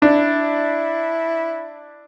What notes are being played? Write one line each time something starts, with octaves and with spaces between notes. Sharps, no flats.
D4 E4